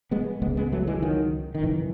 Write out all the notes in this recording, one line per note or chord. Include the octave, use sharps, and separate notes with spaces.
G#3 B3
C#2 C#3 G#3 B3
G#3 B3
F#3 A3
E3 G#3
D#3 F#3
D#3
G#1 F#2 C#3 E3